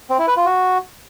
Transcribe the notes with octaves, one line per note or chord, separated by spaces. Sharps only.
C4
E4
B4
F4
F#4